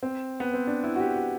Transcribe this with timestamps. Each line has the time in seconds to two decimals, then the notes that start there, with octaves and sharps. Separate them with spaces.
0.03 C4
0.40 B3
0.54 C4
0.67 D4
0.84 E4
0.96 F#4
1.00 G4
1.16 F#4